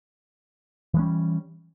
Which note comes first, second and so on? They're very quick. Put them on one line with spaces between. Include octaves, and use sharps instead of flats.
E3 G#3 C#4 G3